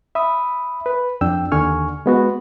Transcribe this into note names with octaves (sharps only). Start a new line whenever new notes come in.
E5 B5 D#6
B4
F2 D4 G5 E6
D#2 D3 G#5 C#6 F6
G#3 B3 F#4